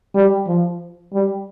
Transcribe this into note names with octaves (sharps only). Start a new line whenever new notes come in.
G3
F3
G3